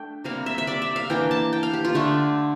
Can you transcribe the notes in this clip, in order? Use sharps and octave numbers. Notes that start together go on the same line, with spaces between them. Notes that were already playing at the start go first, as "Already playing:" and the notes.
Already playing: A3 D4 G5
C3 G3 A#3 F5
E5
E5
D5
E5
F5
E3 A#3 D4 G5
A5
G5
F5
G4
F4
D3 A3 D4